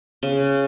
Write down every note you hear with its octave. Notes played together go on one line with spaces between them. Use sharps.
C#3